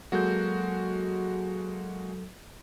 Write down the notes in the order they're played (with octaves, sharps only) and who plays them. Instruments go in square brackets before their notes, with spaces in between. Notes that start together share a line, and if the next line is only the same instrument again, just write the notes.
[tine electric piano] F#3 A4 G6 [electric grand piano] G#3 A#3 F#4